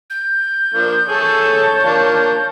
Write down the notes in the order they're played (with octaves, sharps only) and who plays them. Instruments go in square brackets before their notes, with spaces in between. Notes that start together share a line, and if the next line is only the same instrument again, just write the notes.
[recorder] G6
[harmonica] F3 A#3 D4
[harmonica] A3 G#4 A4 [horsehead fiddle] C#5 A5
[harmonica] A#3 D4 F4